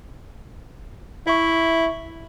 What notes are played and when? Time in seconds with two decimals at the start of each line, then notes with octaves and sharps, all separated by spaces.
1.27 E4 E5 C#6